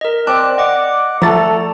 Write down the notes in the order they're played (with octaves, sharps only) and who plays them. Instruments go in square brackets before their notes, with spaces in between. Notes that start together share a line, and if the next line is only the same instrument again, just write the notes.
[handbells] A#4 D#5
[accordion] C4 F#6 [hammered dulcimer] D5 [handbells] A5
[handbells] D#5 D6 [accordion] F#5
[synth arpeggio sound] F3 A6 [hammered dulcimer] A3 [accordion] A4 [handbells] A#5